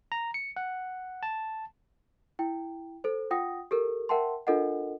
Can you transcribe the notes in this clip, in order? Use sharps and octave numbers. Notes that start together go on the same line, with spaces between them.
A#5
C#7
F#5
A5
E4 G5
A4 C5
F4 F#5 G5 D#6 A#6
G4 A4 A#4
A#4 E5 F#5 G5 A5 C6
D4 F4 A4 A#4 D#5 F#5